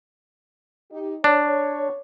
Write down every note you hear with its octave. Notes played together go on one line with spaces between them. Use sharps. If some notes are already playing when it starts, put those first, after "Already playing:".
D#4 G4
D4 C#5